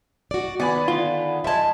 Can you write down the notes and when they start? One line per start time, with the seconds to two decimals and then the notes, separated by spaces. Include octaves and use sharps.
0.31 F#4 D5
0.60 D#3 B3 D5 F#5 G#5 B5
0.88 D3 F4
1.44 F3 G#3 E5 A5